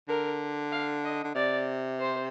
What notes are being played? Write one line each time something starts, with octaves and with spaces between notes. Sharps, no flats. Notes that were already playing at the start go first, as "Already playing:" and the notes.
D3 A#4
F5
D#5
D3
C3 D5
C5